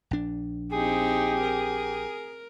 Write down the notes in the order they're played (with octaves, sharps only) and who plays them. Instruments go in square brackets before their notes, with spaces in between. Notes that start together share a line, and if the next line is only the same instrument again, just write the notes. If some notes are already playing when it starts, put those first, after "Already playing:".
[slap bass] A#1 D4
[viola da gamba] C4 D#4 [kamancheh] G4 [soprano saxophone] G#4
[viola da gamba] A#4